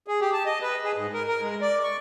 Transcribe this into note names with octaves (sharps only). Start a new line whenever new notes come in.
G#4
G4
A5
D#5
B4
G#4
G#2
A#4
A#4
G#3
D5
C#6